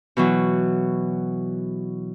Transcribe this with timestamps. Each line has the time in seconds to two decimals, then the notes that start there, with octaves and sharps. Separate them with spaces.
0.17 B2 E3 F#3